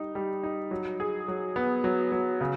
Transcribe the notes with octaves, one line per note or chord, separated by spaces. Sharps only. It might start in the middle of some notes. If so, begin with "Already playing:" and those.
Already playing: G3 D#4
G3
D#4
F#3
G#4
F#3
B3
F#3
F#3
C#3